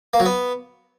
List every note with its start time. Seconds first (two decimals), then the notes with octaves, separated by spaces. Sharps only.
0.14 A#3
0.19 F#3
0.25 B3